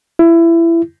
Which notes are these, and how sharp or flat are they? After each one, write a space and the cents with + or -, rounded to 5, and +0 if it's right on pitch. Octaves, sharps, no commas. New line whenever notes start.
E4 +20